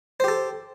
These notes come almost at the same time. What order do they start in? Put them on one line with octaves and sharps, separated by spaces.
C5 G4 A4